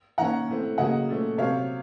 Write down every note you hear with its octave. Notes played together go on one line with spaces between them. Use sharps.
D#3 A#3 C#4 F#5 A#5
A2 A3 C4
C#3 F#3 A#3 D#5 F#5
A#2 A3 C#4
C3 F#3 C4 C#5 F5